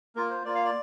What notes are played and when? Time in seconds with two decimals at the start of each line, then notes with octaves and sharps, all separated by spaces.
0.16 A#3 F4 A#4
0.30 C5
0.45 A#3 F4 D5
0.55 F5
0.65 D5